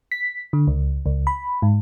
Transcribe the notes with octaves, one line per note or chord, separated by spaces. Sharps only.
B6
D3
C#2
C#2
B5
G#2